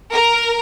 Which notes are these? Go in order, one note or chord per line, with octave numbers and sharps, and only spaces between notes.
A#4